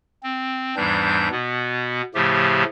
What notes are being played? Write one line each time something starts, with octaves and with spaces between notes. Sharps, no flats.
C4
E2 G#2 E3 G3 D4 G6
B2 B3
A2 C#3 F3 A3 G4